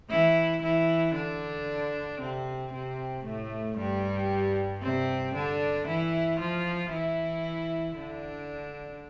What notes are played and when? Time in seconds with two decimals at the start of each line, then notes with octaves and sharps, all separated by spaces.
0.10 E3 E4
0.62 E3 E4
1.15 D3 D4
2.20 C3 C4
2.72 C3 C4
3.25 A2 A3
3.78 G2 G3
4.82 C3 C4
5.35 D3 D4
5.87 E3 E4
6.40 F3 F4
6.92 E3 E4
7.97 D3 D4